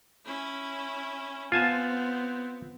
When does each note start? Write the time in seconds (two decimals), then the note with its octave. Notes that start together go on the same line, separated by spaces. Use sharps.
0.25 C#4 E4
1.52 B3 C4 F4 G#5 A5